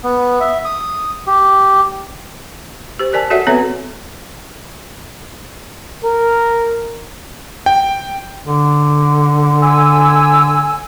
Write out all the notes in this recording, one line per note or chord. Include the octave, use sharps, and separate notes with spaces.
B3
E5
D#6
G4
G4 C5
A#4 D5 G#5 A5
F#4 A4 C#5 D5 E5 F#5
B3 C4 A4 B4 C#5 E5
A#4
G5
D3
G#5 E6